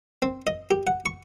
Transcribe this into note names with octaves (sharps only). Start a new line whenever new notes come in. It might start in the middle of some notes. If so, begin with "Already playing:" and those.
C4
D#5
G4
F#5
C#6